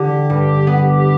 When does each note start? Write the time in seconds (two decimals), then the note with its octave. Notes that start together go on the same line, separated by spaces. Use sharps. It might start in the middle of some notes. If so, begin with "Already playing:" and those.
Already playing: D3 G4
0.30 G2
0.67 B3